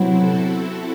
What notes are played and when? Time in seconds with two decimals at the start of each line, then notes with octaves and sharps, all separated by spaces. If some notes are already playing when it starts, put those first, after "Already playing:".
Already playing: C3 F#3 B3 C4 E4
0.17 F#4 A4
0.55 F#4 A4